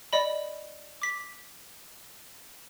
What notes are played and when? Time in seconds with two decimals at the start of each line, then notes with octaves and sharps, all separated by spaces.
0.13 D5 D#5 B5
1.02 D6 B6